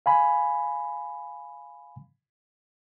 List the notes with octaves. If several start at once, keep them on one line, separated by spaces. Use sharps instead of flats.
F5 G#5 B5